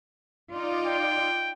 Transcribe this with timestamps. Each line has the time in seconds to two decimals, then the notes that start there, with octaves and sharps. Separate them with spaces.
0.51 D#4 F4 D5
0.86 G5